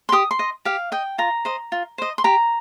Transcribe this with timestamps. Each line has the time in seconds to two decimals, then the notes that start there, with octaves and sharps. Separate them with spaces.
0.09 C6
0.12 G4 D#6
0.31 C6
0.39 D#5
0.65 G4 F5
0.92 D#5 G5
1.18 F4 A#5
1.45 C5 D#5
1.72 F4
1.98 C5 D#5
2.18 C6
2.24 G4 A#5